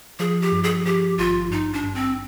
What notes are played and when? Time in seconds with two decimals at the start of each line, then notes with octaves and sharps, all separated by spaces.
0.19 F3 G#4
0.42 G4
0.52 G2
0.63 G#4
0.85 F3 G4
1.18 G#1 F4
1.51 G2 D#4
1.73 D4
1.84 G2
1.95 C4